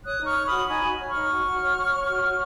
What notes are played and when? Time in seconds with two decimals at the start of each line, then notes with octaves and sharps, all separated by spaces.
0.05 C#5 D#6 F#6
0.21 D#4
0.26 C#6 F6
0.37 C#5
0.47 F#4 B5 D#6
0.68 D#4 G#5 B5
0.83 F#4
0.99 C#5
1.09 C#6 F6
1.15 D#4
1.30 F#4
1.46 F#4
1.62 C#5
1.77 C#5
1.92 C#5
2.07 F#4
2.23 F#4